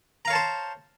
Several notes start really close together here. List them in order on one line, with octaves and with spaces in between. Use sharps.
A#5 F5 C#5 A5 C5